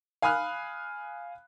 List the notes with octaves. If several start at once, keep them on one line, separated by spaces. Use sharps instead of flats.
F5 G#5 B5 D#6 F6 F#6